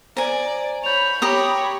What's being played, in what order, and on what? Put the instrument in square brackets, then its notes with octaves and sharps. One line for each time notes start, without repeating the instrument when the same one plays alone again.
[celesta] C5 [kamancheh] D5 [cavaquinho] G#5 A#5
[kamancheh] C#5 B5 [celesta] G6 F7
[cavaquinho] G4 A#5 D#6 [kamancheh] C#5 B5